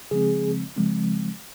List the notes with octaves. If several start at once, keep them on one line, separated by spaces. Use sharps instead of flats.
C#3 F3 G#3 C4 G#4
C#3 F3 G#3 C4